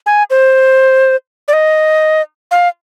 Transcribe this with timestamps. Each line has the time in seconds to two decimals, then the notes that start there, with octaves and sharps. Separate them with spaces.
0.06 G#5
0.30 C5
1.48 D5
1.53 D#5
2.51 F5